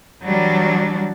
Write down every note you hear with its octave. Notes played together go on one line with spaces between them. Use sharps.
E3 F#3 G3 D4